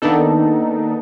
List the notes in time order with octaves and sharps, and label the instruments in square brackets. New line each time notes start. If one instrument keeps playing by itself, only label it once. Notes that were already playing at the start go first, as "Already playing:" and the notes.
[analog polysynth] D#3 A#3 B3 D4 D#4 A4